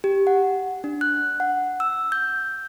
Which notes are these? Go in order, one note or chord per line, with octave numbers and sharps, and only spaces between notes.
G4
F#5
D4
F#6
F#5
E6
G6